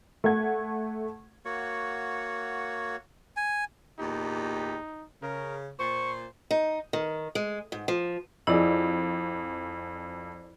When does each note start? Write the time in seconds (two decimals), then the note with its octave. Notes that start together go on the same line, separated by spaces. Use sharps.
0.24 A3 F#5 G#6
1.45 A#3 F#4 C#5 F#5
3.37 G#5
3.99 E2 A#2 D#4 G4
5.23 C#3 A#4
5.80 A#2 C5 C#6
6.51 D#4
6.93 D#3
7.35 G#3
7.72 G#2
7.88 F3
8.47 F2 E4 G#4 D5 D#5